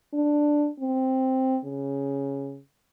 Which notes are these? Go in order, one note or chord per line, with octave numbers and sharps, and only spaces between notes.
D4
C4
C#3